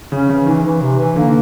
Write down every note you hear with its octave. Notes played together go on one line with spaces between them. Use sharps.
C#3 C#4
C#3 E3
D#3 E3
E3
C3
E3
D3 A#3